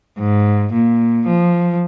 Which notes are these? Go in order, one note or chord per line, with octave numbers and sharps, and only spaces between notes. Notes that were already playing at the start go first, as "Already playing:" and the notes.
G#2
A#2
F3